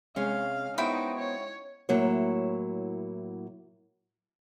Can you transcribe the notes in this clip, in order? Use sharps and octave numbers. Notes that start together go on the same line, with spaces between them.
C3 G#3 C#4 G#4 F5
B3 D#4 E4 F#4 C5 G5
C#5
A2 F#3 A#3 E4 C#5